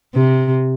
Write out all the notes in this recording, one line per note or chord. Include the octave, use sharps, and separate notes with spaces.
C3